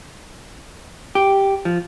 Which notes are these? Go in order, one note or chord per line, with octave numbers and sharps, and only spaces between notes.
G4
F3